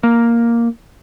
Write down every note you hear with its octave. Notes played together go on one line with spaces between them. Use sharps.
A#3